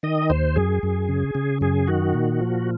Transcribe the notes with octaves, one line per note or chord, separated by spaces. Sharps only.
D#3 D#5
D#2 C5
F#2 G#4
F#2
C#3
C#3
F#2 G#4
D#3 F#4
A#2
F3